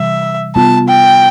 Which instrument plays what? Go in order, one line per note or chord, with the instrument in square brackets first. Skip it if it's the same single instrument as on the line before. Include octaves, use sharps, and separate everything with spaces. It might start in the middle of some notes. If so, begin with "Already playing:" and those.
Already playing: [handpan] C3 E3 G3 [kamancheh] E5
[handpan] C3 G3 B3 F4 [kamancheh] A5
[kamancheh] G5